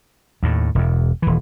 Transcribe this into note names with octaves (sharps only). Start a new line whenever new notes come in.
D#2 A2
E1 E2
D#1 E3